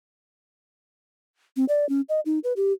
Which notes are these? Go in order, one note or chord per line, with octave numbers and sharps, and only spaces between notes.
C4
D5
C#4
D#5
D#4
B4
G4